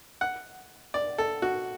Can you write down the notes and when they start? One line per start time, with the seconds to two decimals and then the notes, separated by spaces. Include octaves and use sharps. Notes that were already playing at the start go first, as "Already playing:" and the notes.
0.21 F#5
0.94 D5
1.18 A4
1.42 F#4